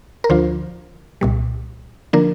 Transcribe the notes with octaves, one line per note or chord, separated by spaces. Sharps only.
A#4
D2 D3 F3 D4 F4 C5
C2 A#2 G3
D3 F3 A#3 D4 A#4